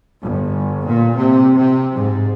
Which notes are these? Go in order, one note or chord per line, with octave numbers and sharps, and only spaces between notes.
G1
A#2
C3
C3
G#2